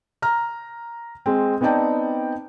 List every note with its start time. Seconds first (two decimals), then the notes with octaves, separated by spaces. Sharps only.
0.22 A#5 F6
1.26 G#3 C4
1.61 B3 C4 D#4 D5 G5 A5